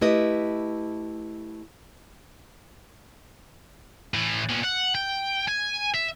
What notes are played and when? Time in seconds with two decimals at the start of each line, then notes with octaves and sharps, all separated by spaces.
0.01 A3 E4 G4 B4 D#5
4.14 A2 E3
4.49 A#2 B3
4.64 F#5
4.95 G5
5.48 G#5
5.94 E5